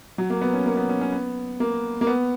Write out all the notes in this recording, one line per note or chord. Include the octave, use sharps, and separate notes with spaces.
F#3
A#3
B3
C#4
A#3
B3
C#4
C#4
B3
A#3
A#3
B3